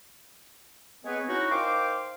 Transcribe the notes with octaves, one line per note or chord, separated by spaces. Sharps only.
G#3 B3 C4 G#4 B4 C#5
C#4 D#4 E4 F#4
D#3 C5 F5 G5 C6 D6